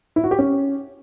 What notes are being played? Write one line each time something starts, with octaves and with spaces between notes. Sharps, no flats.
E4
F#4
G4
C#4